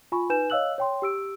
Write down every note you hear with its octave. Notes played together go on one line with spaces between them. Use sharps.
F4 G#5 B5 C#6
D#4 B4 G#5 G6 E7
C#5 D#5 F5 E6 F#6 F#7
C#5 G5 C6
G4 E6 D7